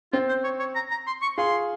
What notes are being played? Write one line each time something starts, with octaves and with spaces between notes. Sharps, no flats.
C4 F4
C5
C#5
C#5
A#5
A#5
C6
C#6
F4 G#4 C6